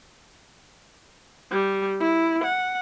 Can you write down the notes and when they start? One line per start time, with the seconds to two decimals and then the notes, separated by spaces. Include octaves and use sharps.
1.51 G3
2.00 E4
2.44 F#5